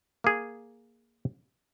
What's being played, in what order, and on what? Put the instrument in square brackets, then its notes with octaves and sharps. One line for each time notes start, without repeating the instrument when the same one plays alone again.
[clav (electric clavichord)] A#3 G#4